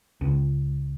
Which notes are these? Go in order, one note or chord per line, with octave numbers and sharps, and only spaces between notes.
C#2